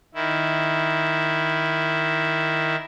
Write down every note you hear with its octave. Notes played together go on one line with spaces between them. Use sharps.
D#3 E4